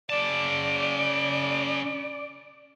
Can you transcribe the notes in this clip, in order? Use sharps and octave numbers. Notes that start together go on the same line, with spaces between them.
C#3 D5 A5